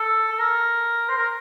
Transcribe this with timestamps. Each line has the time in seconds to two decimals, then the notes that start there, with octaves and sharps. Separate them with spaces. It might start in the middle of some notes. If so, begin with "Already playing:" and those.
Already playing: A4
0.32 A4
0.39 A#4
1.09 C5
1.18 A#4